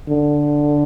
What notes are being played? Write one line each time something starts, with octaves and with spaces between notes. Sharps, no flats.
D3